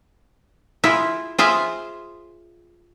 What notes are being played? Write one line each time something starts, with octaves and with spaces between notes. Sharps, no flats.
E4 F4 G#4
F4 G#4 C5 E5 F5